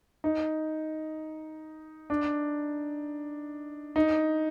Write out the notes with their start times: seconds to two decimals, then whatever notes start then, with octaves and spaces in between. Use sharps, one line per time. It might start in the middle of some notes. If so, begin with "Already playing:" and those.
0.24 D#4
2.10 D4
3.96 D#4